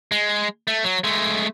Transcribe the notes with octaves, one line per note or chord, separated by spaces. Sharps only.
G#3
A3
F#3
G#3 A3